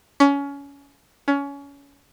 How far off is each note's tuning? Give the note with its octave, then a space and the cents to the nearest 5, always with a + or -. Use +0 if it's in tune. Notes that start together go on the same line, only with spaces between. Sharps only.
C#4 +25
C#4 +25